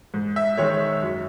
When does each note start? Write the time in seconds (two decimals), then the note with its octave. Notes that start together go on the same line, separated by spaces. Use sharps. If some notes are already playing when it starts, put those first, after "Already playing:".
0.14 G#2
0.36 E5
0.57 D#3 G#3 C#5
1.03 F#2